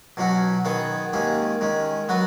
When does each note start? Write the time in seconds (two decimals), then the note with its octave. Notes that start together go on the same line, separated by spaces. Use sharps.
0.17 B2 F#3 C#4 F#4 C#5
0.65 D#3 B3 G#4 C#5
1.13 D#2 D#3 G#3 C#4 G#4
1.61 D#3 G#3 C#4
2.09 F#3 B3 F#4 B4